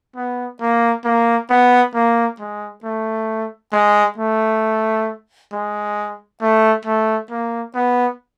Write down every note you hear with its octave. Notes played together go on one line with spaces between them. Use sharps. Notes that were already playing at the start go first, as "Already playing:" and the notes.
B3
A#3
A#3
B3
A#3
G#3
A3
G#3
A3
G#3
A3
A3
A#3
B3